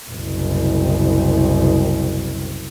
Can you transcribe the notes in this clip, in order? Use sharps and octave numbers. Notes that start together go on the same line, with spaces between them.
F#1 C2